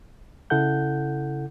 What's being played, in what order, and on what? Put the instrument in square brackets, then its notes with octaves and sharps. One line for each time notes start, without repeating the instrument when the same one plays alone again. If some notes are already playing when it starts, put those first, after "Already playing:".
[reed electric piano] C#3 E4 A4 F#5 G6